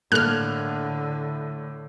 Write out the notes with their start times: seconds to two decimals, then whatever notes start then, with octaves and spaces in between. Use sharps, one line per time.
0.12 A2 D3 A#3 A4 F6 F#6 G#6 F7